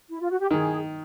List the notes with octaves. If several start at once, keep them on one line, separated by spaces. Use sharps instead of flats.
E4
F4
F#4
G4
D#3 G#4